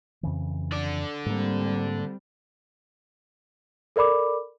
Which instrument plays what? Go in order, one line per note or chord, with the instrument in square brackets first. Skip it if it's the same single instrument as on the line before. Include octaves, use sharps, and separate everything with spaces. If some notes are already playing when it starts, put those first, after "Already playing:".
[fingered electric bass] F2 C#3 E3
[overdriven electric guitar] D3 D5
[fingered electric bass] G#2 A#3 [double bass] G3 C4
[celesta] A4 A#4 D5 B5 D6